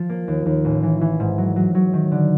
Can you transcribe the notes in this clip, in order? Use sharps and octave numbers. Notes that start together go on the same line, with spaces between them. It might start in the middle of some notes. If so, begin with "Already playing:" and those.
Already playing: F3
A#3
D#2
D#2
A1
E3
E3
G#2
F#3
F#3
F#3
D#3
D3